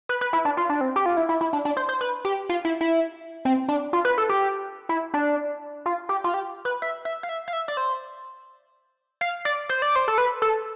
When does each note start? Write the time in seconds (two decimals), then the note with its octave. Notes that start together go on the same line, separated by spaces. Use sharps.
0.09 B4
0.21 B4
0.33 E4
0.45 D4
0.57 F4
0.69 D4
0.81 C4
0.96 G4
1.06 F4
1.17 E4
1.29 E4
1.41 E4
1.53 D4
1.65 D4
1.77 C5
1.89 C5
2.01 B4
2.25 G4
2.49 F4
2.65 E4
2.81 E4
3.45 C4
3.69 D4
3.93 F4
4.05 B4
4.18 A4
4.29 G4
4.89 E4
5.14 D4
5.86 F4
6.09 G4
6.24 F4
6.34 G4
6.65 B4
6.82 E5
7.05 E5
7.23 F5
7.29 E5
7.48 F5
7.53 E5
7.68 D5
7.77 C5
9.21 F5
9.45 D5
9.69 C5
9.82 D5
9.96 C5
10.08 A4
10.18 B4
10.42 A4